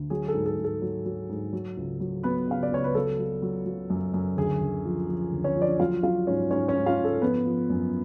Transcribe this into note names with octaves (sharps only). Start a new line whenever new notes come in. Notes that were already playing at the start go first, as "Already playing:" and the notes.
Already playing: D2
F#3 G#4
A4
G#2
A4
G#2
A4
F#3
F#3
G#2
F#3
C#2
F#3
F#3 B3 B4
C#3 F5
D5
C#2 C#5
B4
F#3 A4
F#3
F#3
F#3
F#2
F#2
D2 G#4
D2
F3
F3
D2
C#4 C#5
F3
D4 D5
F#3 F4 F5
F#3 F4 F5
G#2 C#4 C#5
G#2 C#4 C#5
C#4 C#5
G#2
F4 F5
G#2
A4
F3 B3 B4
F3
F#2